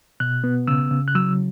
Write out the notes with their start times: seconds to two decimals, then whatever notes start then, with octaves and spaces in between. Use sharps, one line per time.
0.20 B2 F#6
0.44 B3
0.68 C#3 E6
0.91 C#3
1.08 F#6
1.15 F#3 E6